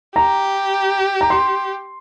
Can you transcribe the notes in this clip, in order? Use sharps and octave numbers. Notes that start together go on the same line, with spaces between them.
G4 A#5
A#5
C6